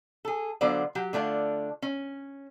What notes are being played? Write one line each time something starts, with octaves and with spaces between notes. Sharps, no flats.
G#4 A4
D3 F#3 B3 F4 C5 D5
F#3 G4
D3 A3 D4 F4
C#4